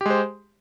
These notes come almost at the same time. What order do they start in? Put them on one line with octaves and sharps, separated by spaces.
G4 G#3 C5